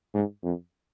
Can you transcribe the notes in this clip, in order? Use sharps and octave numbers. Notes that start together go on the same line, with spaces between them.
G#2
F2